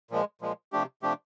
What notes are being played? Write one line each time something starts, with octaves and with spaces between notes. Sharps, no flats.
A#2 F3 G#3
A#2 F3 G#3
C3 F3 A3 D4 G4
C3 F3 A3 D4 G4